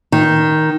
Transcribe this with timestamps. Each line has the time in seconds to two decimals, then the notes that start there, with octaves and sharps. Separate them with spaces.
0.12 D#3